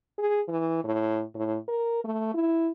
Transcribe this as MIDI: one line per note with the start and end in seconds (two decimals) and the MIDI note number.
0.18 0.40 68
0.48 0.80 52
0.84 1.22 45
1.35 1.56 45
1.68 2.02 70
2.04 2.33 57
2.34 2.70 64